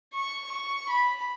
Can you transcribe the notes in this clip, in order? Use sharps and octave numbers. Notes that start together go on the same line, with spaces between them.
C#6
C#6
B5